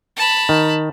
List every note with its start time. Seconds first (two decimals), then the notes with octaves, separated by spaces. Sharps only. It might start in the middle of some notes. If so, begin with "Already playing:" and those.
0.17 A5 B5
0.49 D#3